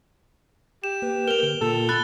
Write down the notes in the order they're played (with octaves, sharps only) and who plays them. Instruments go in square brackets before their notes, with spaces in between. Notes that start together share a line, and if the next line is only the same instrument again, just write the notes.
[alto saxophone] G4 [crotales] E7
[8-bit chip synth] A#3 B4
[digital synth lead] A#4 [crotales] F7 G7
[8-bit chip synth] D3
[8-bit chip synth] A#2 A#3 F4 [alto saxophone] A4
[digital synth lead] B5 [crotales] F#6 A6 G7